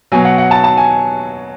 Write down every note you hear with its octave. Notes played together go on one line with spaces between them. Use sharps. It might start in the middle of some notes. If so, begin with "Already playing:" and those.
B2 F#3 G#5
F#5
F#5
A5
A5
G#5